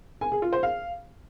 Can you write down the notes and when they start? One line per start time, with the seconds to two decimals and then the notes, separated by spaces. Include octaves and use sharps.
0.21 G#5
0.32 G#4
0.42 F4
0.53 C5
0.63 F5